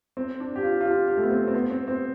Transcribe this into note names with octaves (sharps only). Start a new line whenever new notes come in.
C4
D4
G4
F4
F4
G4
G4
A3
B3
C4
C4
B3
C4
C4